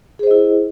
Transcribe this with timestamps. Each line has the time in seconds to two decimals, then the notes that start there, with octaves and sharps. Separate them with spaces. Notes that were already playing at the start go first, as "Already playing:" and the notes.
0.19 G#4
0.23 C5
0.27 D#5
0.31 E4